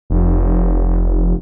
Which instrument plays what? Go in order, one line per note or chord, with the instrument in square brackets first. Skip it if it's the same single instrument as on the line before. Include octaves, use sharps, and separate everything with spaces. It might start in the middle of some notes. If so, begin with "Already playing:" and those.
[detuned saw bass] F1